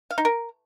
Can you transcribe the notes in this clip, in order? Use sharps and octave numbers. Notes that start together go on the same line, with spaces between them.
F5
D#4
A#4